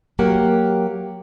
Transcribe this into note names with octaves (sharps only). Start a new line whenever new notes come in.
F#3 A#3 G4 A#4 F#5